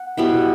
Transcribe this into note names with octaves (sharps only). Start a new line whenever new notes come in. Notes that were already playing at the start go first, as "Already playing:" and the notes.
Already playing: F#5
B2 G3 B3 E4